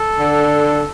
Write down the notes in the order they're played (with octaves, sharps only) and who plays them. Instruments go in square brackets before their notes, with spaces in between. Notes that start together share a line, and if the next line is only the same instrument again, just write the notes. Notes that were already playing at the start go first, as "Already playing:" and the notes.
Already playing: [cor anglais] A4
[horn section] D3